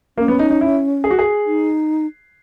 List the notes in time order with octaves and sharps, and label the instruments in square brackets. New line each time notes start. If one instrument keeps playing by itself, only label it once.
[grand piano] A#3 [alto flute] C#4
[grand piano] B3
D#4
D#4
E4
G#4
F#4
G#4
[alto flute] D#4